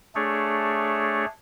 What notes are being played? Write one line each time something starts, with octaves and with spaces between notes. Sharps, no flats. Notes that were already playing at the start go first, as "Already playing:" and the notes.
A3 D4 G#4 C#5